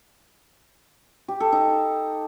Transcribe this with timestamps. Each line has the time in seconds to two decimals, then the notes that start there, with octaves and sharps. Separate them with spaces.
1.28 G4
1.40 A4
1.52 D#4